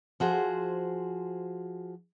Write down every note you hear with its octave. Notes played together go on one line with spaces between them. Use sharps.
F3 F#4 G#4 C5